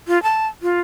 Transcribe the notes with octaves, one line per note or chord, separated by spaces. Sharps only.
F4
A5
F4